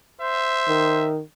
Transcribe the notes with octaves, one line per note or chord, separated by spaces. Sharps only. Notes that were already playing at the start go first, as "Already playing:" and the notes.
C5 E5
D#3